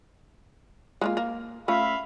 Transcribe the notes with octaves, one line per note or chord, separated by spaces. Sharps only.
G#3 A#3 F4
A#3
A3 C#4 F4 E5 F5 B5